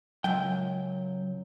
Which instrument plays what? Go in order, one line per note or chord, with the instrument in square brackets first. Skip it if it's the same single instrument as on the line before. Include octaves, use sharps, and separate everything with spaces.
[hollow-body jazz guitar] C#2 F#2 G5 [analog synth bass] F#3